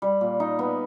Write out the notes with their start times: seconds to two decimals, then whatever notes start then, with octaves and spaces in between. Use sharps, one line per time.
0.02 G3
0.21 A#2
0.40 D#4
0.59 B3